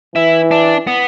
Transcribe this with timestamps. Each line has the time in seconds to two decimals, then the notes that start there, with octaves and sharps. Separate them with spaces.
0.15 E3 E4
0.51 D4
0.87 B3